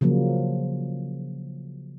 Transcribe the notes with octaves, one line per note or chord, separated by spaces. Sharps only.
C#3 F3 F#3 A#3